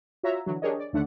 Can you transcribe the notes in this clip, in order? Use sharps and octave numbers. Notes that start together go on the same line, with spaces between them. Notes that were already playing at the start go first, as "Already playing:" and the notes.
F4 F#4 C#5 E5 A#5
D3 E3 F#3
D4 G4 G#4 A#4 C#5 D#5
D5
D#2 D3 A3 D4 F#5